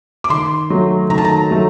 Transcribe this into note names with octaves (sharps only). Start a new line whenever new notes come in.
D6
D#3 C6
F#3 A3 D#4
D#3 A#5
A5
A#5
F#3 A3